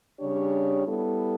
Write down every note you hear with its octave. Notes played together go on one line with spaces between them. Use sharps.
C#3 G3 D4 G4 C#5
G3 B3 E4 A4